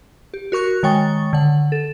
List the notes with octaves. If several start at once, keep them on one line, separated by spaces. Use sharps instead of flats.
G4
F#4 A#4 C#6 F#6
D#3 G#3 C#5 G5 C#6 A6
D3 F#5
A4